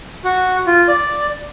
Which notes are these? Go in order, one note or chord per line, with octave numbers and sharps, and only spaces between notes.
F#4
F4
D5